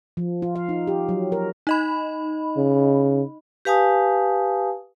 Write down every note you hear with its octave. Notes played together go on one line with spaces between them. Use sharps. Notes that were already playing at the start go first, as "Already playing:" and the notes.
F3
F4
F5
D#4
G4
F#3
A#4
D#4 D#5 B5
C#3
G4 B4 F5 G#5 A5 D#6